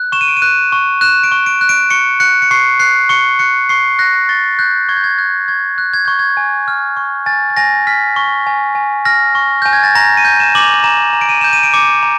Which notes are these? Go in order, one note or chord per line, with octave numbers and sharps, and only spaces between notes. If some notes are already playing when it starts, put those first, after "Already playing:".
Already playing: F#6
C#6 E7
D#7
D7
D#7
F#6
C#6
F#6 E7
D7
C#6
D7
F#6
D7
C#6 C#7
F#6 C#7
C#7
C#6 C7
F#6 C7
C#6 C#7
F#6 C#7
C#6 C7
F#6 A#6
C#6 A6
F#6 G6
C#6 G#6
G6
G#6
F#6 G#6
C#6 G#6
F#6
G#6
C#6 G6
G#6
G#5
F6
C#6
G#5 A6
A6
G#5 A#6
F6 B6
C#6
G#5
G#5
F6 A#6
C#6
G#5 G6
G#6
A6
A#5 A#6
D#7
G6
E7
D6 F#7
F7
A#5 E7
A#5
D7
D#7
G6 E7
D#7
D7
D6 C#7
A#5